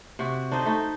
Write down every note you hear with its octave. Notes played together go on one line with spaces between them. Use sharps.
C3 F#4
D4 D#4 C5 D#5
A3 D#4